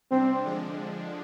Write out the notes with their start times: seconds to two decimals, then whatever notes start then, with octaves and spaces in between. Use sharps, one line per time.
0.11 C3 G3 C4 D4
0.45 D3 F3 G#3 D4